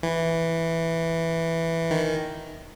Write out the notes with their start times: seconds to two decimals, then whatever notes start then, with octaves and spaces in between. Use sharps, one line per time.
0.03 E3
1.91 D#3